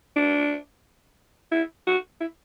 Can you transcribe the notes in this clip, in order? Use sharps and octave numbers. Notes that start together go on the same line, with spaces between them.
D4
E4
F#4
E4